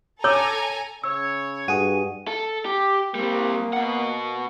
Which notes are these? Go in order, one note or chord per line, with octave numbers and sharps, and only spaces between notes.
A4 C#5 G#5 A#5 D6 E6
C#3 C#5 E6
G2 F#4 G#4 D#7
A4
G4
G3 A#3 C4
B2 F#5